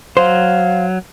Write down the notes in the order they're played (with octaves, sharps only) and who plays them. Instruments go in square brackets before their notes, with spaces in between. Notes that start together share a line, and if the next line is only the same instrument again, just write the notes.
[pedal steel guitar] F#3 [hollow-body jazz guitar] C5 [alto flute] F5